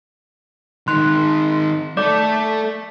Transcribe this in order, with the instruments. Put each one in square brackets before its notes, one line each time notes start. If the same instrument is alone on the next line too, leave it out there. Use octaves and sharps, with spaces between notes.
[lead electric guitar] D#3 G#3 [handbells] C6 F#6
[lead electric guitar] A3 A4 [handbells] D5 D6